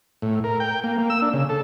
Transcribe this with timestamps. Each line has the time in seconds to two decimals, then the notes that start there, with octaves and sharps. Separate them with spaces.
0.22 A2
0.44 A#4
0.60 G5
0.84 A#3
0.98 A#3
1.10 E6
1.22 D4
1.33 C#3
1.49 A4